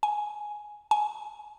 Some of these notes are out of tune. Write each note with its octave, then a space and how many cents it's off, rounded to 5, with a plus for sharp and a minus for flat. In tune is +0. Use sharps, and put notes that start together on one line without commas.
G#5 +5
G#5 +15